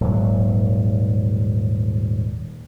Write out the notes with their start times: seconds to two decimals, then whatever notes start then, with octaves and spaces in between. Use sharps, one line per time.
0.01 D#1 G#2 F#3